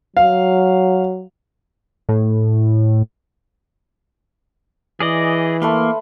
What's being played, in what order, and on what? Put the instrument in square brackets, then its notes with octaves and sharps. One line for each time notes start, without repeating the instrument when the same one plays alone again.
[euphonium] F#3 [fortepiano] F5
[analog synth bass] A2
[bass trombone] E3 [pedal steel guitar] G#4 D5 D#5
[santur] A3 B4 C6 [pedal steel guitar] A#3